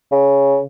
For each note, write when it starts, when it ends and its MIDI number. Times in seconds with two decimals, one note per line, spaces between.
0.11 0.61 49